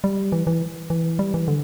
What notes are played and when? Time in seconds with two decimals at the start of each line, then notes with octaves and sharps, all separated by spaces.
0.04 G3
0.32 E3
0.47 E3
0.90 E3
1.19 G3
1.34 E3
1.48 D3